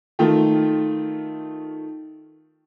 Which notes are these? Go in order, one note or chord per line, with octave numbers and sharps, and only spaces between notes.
D#3 A3 F4